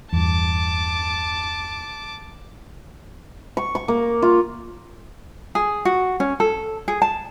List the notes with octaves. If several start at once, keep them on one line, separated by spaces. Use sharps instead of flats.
E2 G2 A5 D6
C#6
C#6
A#3
F4
G#4
F#4
C#4
A4
G#4
A5